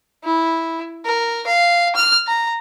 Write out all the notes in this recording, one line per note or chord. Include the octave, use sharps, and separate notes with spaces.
E4
A#4
F5
F6
A#5